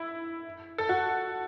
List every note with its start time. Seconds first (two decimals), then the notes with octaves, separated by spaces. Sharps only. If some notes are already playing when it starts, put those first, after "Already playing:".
Already playing: E4
0.78 A4
0.89 F#4